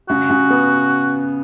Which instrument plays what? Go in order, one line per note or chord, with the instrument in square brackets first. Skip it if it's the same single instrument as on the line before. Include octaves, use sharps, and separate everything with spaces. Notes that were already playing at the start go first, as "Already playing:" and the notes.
[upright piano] C#3 [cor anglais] F#4
[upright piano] C#3
B3